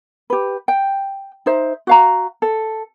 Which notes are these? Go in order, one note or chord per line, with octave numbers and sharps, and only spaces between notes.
G4 B4
G5
D#4 C5 E5
F#4 F5 A#5
A4